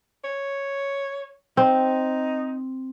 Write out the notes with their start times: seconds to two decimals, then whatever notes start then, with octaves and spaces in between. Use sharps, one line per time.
0.24 C#5
1.57 C4 D#4